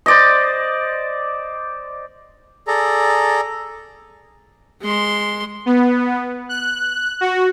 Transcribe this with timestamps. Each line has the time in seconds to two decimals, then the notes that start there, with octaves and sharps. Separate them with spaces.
0.06 C5 D5 D#5
2.67 G#4 A4 D5 A#5
4.82 G#3 C6
5.66 B3
6.49 F#6
7.21 F#4